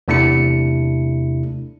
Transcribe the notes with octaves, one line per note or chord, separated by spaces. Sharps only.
E2 C3 A3 D4 E4 C#7